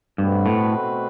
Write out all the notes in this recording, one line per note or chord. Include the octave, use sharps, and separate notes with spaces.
G2 B2 A3 C4 F#4 B4
A2